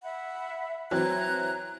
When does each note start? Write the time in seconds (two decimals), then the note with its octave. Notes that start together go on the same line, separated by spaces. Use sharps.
0.02 E5 F#5 B5
0.91 E3 F#3 C4 A#5 F#6 G#6